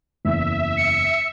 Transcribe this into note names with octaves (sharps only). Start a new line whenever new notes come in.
F#1 E2 E5
C#7